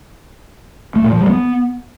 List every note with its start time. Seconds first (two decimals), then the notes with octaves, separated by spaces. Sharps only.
0.96 A3
1.04 A#2
1.12 F3
1.21 G3
1.29 B3